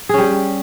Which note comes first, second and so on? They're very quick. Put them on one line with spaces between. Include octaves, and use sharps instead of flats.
G#4 C#4 G3